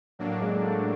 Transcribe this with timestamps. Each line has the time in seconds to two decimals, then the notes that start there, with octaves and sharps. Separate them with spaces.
0.19 A2 F#3 A#3 D4
0.41 G#3
0.63 A3